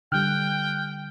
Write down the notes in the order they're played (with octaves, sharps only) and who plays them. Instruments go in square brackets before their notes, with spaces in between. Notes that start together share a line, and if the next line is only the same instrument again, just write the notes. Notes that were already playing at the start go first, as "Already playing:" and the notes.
[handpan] D3 G3 [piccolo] G5 [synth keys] F6 F#6